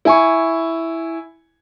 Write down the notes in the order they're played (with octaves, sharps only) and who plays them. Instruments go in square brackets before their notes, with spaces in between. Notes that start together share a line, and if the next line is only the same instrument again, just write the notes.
[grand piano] E4 G#5 C#6